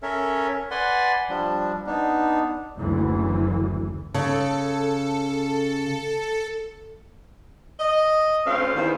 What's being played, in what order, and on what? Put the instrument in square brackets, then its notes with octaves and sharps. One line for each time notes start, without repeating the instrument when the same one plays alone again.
[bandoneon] C#4 A4 A#4 C#5 E5
B4 D5 F#5 G#5 C6
F3 G3 D4
B3 D4 D#4
[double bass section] F#1 D2 E3
[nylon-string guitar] C#3 [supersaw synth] A4 C#7
[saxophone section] D#5
D2 C4 C#4 F5
E2 G2 D#3 C5